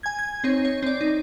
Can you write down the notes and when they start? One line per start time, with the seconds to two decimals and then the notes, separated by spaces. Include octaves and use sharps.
0.03 G#5 G#6
0.19 G#6
0.44 C4 D#4 C#5
0.65 C#5
0.83 C4 D5
1.01 D#4